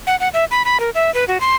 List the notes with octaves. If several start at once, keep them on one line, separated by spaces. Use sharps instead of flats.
F#5
F#5
E5
B5
B5
A#4
E5
B4
F#4
C6